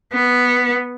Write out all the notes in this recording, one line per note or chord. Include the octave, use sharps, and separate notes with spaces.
B3